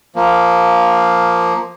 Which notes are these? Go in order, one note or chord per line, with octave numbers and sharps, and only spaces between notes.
F3 A#3